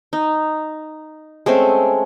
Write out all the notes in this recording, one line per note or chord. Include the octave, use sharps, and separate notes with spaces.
D#4
G#3 A3 C4 C#4